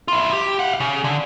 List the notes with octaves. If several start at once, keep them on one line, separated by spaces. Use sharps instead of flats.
E4 F4
G4
F5 F#5
C#3
D3